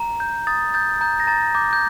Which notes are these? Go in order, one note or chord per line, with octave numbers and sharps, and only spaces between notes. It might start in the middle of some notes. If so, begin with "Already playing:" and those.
Already playing: A#5
G6
D#6 A6
G6 A6
A#5 G6
A#6
A#5 A6
D6 G6
G6